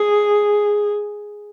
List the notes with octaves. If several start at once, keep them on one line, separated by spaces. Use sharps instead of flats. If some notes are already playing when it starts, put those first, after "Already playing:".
Already playing: G#4